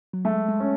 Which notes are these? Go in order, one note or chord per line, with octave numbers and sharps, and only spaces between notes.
F#3
G#3 A3
G#3
C#4